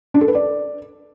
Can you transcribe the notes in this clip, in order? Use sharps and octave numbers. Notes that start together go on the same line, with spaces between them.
D4
A4
B4
D5